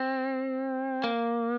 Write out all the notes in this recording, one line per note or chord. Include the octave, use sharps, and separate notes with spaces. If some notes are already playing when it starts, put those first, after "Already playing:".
Already playing: C4
A#3